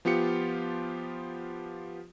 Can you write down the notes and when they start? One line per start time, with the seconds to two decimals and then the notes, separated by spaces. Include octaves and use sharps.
0.05 F3 B3 F4 G4 C#7